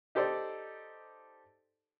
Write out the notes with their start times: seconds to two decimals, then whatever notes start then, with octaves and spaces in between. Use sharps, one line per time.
0.15 D#4 G4 A4 C5 D5